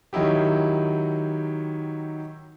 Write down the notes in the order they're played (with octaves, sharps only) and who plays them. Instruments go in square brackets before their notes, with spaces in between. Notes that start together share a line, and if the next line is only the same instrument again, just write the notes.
[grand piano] D#3 F#3 D#4 E4 G4